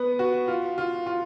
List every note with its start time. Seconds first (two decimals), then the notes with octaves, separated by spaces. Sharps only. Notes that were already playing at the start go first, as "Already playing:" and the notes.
Already playing: B3 B4
0.19 F#4
0.48 F4
0.78 F4
1.07 F4